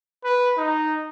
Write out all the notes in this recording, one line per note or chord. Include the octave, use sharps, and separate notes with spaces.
B4
D#4